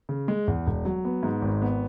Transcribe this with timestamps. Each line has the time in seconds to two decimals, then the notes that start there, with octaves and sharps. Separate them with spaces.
0.09 C#3
0.28 G#3
0.48 E2
0.66 E1
0.85 F#3
1.05 B3
1.23 G#2
1.42 G#1
1.62 B3